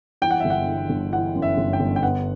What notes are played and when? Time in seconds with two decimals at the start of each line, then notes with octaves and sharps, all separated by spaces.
0.22 E3 G5
0.31 F#5
0.40 E5
0.45 G1
0.50 F#5
0.67 E3
0.90 G1
1.13 E3 F#5
1.35 F#2
1.42 E5
1.57 G1
1.73 G5
1.80 G1
1.96 G5
2.03 B3 F#5